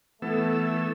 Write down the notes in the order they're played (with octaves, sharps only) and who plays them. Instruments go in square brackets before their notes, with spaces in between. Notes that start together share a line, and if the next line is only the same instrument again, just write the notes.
[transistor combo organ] E3 A4 E6 [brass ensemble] A3 [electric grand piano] B3